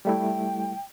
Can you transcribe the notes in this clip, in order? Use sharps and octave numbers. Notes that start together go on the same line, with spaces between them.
G3 A3 E4 G5